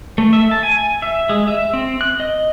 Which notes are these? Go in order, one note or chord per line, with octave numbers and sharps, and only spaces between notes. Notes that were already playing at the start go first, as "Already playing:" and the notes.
A3
E5
A5
G#5
E5
G#3
E5
C4
F#6
D#5